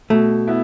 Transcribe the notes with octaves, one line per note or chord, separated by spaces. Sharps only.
B2 A3
B3 E4